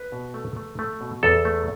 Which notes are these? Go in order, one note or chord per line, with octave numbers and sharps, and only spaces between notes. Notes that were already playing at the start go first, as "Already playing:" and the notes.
Already playing: B4
B2
A3
A3
A3
B2
E2 A4
A3